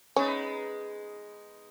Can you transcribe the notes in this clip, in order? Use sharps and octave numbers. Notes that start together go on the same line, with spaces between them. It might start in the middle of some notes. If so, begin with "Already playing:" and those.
G#3 B3 C#4 D#4